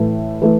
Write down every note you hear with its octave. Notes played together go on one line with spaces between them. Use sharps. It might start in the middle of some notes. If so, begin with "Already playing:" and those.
Already playing: A2 E3 A3
E3 A3